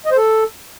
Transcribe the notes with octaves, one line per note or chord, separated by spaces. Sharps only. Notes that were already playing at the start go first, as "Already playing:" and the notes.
D#5
C5
A4